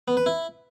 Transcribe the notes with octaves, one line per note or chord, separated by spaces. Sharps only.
B3
B4
E4